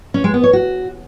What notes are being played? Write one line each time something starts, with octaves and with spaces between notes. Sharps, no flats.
C#4
G#3
B3
C#5
F#4